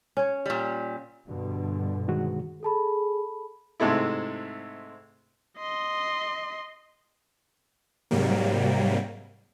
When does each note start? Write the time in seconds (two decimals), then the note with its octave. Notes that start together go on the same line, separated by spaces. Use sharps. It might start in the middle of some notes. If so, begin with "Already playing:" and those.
0.17 C#4 C#5
0.46 A#2 G3
1.28 G2 B2 D3
2.08 D#3 G#3 F#4
2.63 G#4 A4 A5 B5
3.80 G#2 C3 G#3 A3 E4
5.58 D#5 C6
8.11 G#2 C3 F#3 G3 A#3